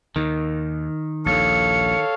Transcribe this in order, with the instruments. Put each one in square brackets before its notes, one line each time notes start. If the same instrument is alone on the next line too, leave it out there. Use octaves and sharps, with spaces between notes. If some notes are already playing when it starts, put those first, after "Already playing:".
[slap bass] D#2 [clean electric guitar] D#3
[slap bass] A#1 D#2 [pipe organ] A4 C#5 F5 [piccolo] C#7